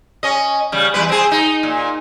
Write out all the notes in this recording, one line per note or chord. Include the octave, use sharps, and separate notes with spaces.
C#4 D#5
C#3 G3
E2 G3 B4
C4 G#4
D#4
A#2